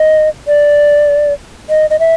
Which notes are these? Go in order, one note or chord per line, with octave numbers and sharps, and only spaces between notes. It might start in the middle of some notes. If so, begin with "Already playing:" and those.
Already playing: D#5
D5
D#5
D#5
E5